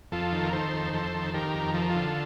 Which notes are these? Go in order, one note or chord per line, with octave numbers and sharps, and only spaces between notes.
F2 F4 A4
D#3
A#4
D#3 A4 C5
F2
F2 A4 C5
D#3
D#3 G4 A#4
F2
F3 A4
A#4
D3 F4 A4